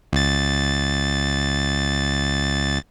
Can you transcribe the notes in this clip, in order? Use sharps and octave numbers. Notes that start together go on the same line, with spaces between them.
C#2 A6